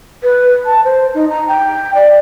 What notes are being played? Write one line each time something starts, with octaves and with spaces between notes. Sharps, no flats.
B4
A5
C5
D#4
A#5
G5
D5